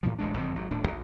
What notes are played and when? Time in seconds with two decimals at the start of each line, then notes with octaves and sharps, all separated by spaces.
0.03 A2 E3 F3
0.19 D1 A1 G#3 D4
0.37 F#1 F2 D3 C4
0.55 G#1 F#3
0.71 D#1 A2 D4
0.87 A#1